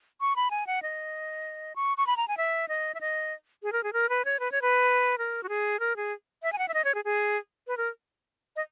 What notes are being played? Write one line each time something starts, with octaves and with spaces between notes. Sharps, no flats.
C#6
B5
G#5
F#5
D#5
C#6
C#6
B5
A#5
G#5
E5
D#5
E5
D#5
G#4
A#4
G#4
A#4
B4
C#5
B4
C#5
B4
A#4
F#4
G#4
A#4
G#4
E5
G#5
F#5
E5
D#5
C#5
G#4
G#4
B4
A#4
D#5